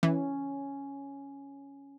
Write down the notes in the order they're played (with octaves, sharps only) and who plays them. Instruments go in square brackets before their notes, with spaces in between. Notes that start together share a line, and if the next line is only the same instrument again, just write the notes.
[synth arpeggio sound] E3 [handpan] C#4